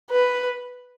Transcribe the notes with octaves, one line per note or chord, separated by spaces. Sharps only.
B4